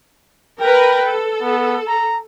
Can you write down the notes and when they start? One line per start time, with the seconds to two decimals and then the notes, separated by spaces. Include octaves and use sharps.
0.61 A#4 B4 G5
1.06 A4
1.42 B3
1.88 A#5